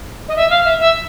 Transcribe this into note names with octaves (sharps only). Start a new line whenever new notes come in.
D#5
E5
F5
E5
E5